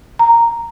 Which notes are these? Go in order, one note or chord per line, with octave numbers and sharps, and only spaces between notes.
A#5